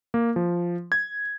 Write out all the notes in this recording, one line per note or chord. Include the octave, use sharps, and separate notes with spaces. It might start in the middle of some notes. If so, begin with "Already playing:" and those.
A#3
F3
G#6